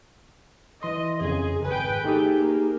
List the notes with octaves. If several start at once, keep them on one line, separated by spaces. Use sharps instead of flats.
E3 D#5 C6
F2 C#3 G#4
G#1 B4 G5 G#5
A3 D#4 G4 G#4
A#3